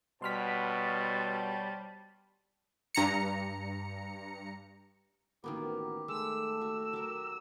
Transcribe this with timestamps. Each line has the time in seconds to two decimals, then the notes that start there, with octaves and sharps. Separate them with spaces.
0.22 B2 G3 C5 C#5 A5 C6 F6 B6
2.95 G2 A#5 C#7
5.44 A1 D#3 A#3 B3 F#4 G4 A#4
6.08 G#3 A3 A4 E6
6.61 F#4
6.93 F#3 A#4